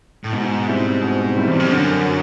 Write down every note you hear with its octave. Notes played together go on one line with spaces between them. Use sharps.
A2
G#2 B2
G3 C4 E4
B2
G3 C4 E4
E2
F2
F#2 D3
F#3